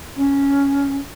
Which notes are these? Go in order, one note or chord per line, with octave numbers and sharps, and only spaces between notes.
C#4